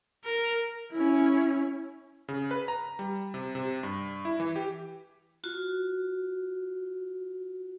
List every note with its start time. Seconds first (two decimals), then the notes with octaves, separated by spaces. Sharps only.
0.24 A#4
0.92 C#4 E4
2.28 C#3
2.51 B4
2.68 A#5
2.99 G3
3.34 C3
3.55 C3
3.83 G2
4.25 E4
4.40 E3
4.56 G4
5.44 F4 F#4